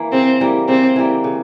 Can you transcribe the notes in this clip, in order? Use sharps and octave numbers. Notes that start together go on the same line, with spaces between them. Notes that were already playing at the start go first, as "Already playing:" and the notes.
Already playing: E3 A#3
C#3 C4
E3 G3 A#3
C#3 C4
E3 G3 A#3
C#3